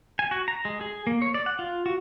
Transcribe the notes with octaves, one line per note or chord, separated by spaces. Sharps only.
G#5
F#4
A#5
G#3
G#4
A#3
C#5
D5
F#5
F4
F#4